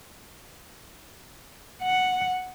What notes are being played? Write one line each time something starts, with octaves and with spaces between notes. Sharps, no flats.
F#5